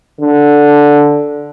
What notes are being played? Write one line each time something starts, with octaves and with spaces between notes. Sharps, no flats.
D3